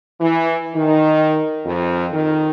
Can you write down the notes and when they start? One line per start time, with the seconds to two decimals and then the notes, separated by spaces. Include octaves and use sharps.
0.20 E3
0.74 D#3
1.65 F2
2.11 D#3